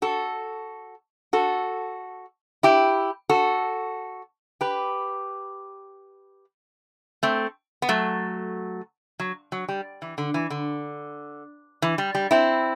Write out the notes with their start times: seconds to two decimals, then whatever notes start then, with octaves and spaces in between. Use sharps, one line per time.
0.02 F#4 A4
1.33 F#4 A4
2.63 E4 G4
3.29 F#4 A4
4.61 G4 B4
7.23 A3 C4
7.82 B3
7.89 F#3 A3
9.20 F#3
9.52 F#3
9.69 G3
10.02 E3
10.18 D3
10.34 E3
10.50 D3
11.82 E3
11.98 G3
12.15 G3
12.31 C4 E4